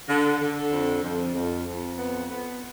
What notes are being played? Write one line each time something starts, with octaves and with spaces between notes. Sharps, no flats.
D3
D3
F2
F2
F2
F2
B3
B3